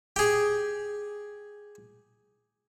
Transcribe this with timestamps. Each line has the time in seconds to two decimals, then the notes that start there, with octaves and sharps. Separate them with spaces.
0.16 G4 G#4